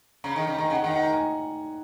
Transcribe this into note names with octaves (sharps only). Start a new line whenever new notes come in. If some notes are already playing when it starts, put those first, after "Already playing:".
C#3 A#5
D#3
C#3
D#3 A#5
G#5
C#3
F#5
D#3 F#5
F#5
A#5
G#5